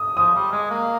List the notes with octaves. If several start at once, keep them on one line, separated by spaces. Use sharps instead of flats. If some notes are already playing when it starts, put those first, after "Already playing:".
Already playing: D#6
F3 D#6
G3
G#3
A#3